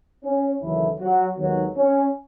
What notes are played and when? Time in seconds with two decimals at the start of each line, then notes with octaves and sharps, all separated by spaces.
0.24 C#4
0.62 D#2 C#3 E3 F#3 A3 E4
0.99 F#3 F#4
1.37 D#2 D#3 F#3 G#3 B3 F#4
1.76 C#4